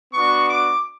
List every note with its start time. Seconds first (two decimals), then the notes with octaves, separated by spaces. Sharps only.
0.14 B3 D4 F#4 C#6
0.49 D6